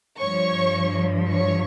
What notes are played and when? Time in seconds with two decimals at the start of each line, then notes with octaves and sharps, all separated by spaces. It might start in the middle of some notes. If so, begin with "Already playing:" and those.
0.20 G2 F3 C#5 C#6
1.31 C#5 C#6